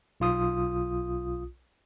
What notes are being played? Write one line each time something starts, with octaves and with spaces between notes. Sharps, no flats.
B1 F4 D#6